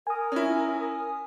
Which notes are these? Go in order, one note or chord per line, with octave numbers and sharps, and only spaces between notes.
A#4 G#5 D#6
C#4 E4